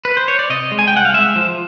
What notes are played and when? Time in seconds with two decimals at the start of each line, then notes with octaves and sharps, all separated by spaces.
0.05 B4
0.17 C5
0.28 C#5
0.39 D5
0.50 C3 D#5
0.72 G#3
0.79 G#5
0.88 G5
0.93 C2 F#5
1.05 F5
1.13 G#3 E5
1.36 F3